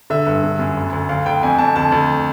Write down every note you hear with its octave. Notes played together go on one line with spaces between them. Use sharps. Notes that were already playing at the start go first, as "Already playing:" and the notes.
D3 E5
G2
D3
F#2
D2
D2
D2 F5
D2 G5
F2 G#5
F2 A5
D2 A5
D2